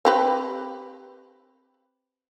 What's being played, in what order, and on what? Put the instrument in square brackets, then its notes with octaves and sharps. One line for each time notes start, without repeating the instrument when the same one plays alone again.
[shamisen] C4 G4 B4